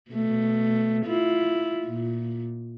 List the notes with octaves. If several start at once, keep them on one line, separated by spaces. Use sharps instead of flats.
B2 A3
E4 F4
A#2